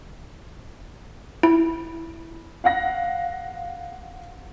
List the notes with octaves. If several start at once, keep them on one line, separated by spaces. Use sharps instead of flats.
E4
F5 F#5 A#6